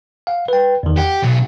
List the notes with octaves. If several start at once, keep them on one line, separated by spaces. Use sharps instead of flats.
F5 F#5
B4 G5
E2 D#3
G4 F#5
B1 F#3